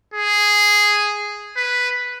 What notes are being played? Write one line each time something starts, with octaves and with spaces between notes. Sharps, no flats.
G#4
B4